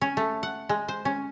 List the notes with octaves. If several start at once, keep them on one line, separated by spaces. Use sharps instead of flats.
C#4
A3
F#5
G#3
C5
C#4